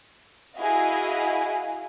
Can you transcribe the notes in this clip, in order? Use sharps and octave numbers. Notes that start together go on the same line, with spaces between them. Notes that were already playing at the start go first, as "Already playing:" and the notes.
E4 F#4 G#4 D#5 F5